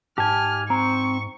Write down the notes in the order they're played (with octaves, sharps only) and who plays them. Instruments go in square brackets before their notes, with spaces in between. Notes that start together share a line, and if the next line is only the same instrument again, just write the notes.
[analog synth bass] G#2 [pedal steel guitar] G4 G#5 [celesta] A5 [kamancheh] F6
[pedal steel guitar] C4 [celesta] A#5 [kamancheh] C#6